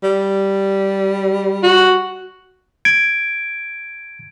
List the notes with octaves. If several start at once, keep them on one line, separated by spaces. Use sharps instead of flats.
G3
F#4
G#6 D7